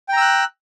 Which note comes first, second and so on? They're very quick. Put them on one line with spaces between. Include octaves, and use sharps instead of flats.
G5 A#5 E6 F#6